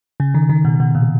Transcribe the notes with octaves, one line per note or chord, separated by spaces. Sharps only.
C#3
D#3
D#3
B2
B2
A#2